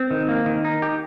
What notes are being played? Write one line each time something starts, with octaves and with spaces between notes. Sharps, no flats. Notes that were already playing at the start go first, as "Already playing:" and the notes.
Already playing: C4
D#3
A#3
D#3
D#4
G4